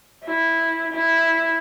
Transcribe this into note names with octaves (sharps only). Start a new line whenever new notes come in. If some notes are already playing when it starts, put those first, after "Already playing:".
E4
E4